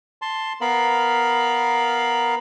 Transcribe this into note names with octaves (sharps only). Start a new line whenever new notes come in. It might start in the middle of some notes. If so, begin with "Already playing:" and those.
A5 C6
B3 A#4 F5 B5